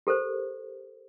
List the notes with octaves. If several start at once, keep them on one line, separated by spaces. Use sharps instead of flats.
G4 A4 A#4 C5